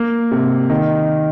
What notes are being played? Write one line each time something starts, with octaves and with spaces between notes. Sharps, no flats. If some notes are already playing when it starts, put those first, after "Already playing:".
Already playing: A#3
C3
D#3